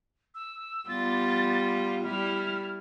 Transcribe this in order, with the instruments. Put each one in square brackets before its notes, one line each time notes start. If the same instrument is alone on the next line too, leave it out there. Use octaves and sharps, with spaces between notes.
[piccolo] E6
[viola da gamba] G3 B3 F4 [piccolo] A6
[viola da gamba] G3 E4 [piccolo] F6